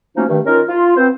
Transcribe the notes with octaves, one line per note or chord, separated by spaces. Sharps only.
F3 F#3 A3 A#3 C#4 D#4
G2 D#3 A3
C#4 D#4 F4 A#4
F4
B3 C4 C5